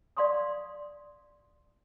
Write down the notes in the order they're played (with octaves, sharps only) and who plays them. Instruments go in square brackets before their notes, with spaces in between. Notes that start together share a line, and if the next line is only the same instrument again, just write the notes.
[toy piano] D5 F5 C6 C#6 D#6